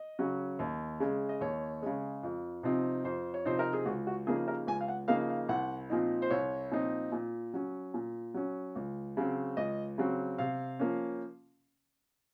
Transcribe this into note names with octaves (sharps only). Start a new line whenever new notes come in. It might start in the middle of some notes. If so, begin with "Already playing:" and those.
Already playing: D#5
C#3 F#3 C#4
D#2
C#3 G#3
D#5
D#2 C#5
C#3 G#3
F2
C3 F3 C4 D#4
F2 C5
C#5
C3 F3 C4 D#4 C5
A#4
G#4
C#2 F#4
F#4
C#3 F3 A#3 D#4 G#4
A#4
C#2 G#5
F5
F#5
C#3 F3 A#3 D#4 F5
F5
C2 F#5
A#2 F3 C4 D#4
C5
C2 C#5
A#2 F3 C4 D#4
A#2
F#3 C#4
A#2
F#3 C#4
C#2
C#3 F#3 C4
C#2 D#5
C#3 F#3 C4
C3 F5
F3 A#3 C#4